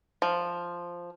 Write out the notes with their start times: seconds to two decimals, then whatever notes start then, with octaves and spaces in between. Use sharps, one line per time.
0.22 F3